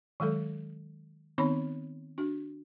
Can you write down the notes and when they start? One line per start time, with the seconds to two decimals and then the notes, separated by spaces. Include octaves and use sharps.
0.20 D#3 F#3 G#3 A4
1.38 D#3 B3 C4 D#4 C#5 B5
2.18 D4 F#4